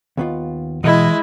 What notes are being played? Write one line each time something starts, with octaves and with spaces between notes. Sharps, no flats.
D#2 B3 F4
B2 E3 G#3 E4 D#5